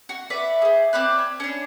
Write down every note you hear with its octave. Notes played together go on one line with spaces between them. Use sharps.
F#4
B4 D5 E5
G#4 C5
C4 D5 B5 F#6
G#5
C#4 D4